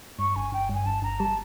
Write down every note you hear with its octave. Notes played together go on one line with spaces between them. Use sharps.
G2 C#6
G1 G#5
G1 G5
G2 G#5
G1 A5
G1 A#5
G3 A5